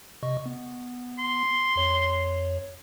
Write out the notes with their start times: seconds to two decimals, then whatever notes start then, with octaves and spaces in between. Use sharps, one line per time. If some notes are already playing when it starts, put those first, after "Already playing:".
0.23 C3 D#5 C#6
0.46 B3
1.19 C6
1.76 F2 C#5